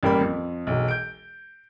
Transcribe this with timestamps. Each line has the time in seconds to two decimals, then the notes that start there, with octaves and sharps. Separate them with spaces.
0.03 A1 G3 A#3 A#4 G5 B5
0.21 F2
0.67 E1 B1
0.88 G6 D7